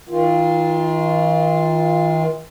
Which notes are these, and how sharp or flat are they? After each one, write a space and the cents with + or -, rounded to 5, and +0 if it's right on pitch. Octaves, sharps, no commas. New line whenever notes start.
D#3 +45 F4 +0